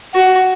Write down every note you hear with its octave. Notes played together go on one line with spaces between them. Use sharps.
F#4